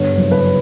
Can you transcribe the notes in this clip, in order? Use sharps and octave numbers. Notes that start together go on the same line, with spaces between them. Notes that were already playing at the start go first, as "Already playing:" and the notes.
Already playing: G2 D3 B3 C#5
F#1
B4